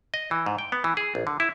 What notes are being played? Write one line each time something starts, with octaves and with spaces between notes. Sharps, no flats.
D#5
E3
G#2
G5
B3
E3
G#4
A#1
D3
E4